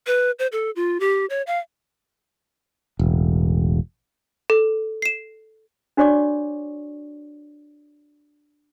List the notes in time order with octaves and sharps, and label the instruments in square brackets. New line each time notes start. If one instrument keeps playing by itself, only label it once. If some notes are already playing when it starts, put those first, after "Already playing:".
[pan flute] B4
C5
A4
F4
G4
C#5
F5
[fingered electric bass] E1 A1
[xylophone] A4
C7 E7
[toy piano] D4 F#4 C#5 D5 C#6 D6